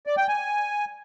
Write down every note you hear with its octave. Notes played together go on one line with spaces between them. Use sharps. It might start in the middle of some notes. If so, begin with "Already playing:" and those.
D5
G5
G#5